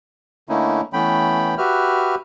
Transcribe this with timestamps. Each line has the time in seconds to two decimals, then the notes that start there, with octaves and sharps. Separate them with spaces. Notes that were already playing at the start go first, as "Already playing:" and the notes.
0.49 D3 A3 A#3 C#4 D#4 E4
0.93 E3 A3 B3 C#4 G5 B5
1.58 F#4 G4 B4 E5 F6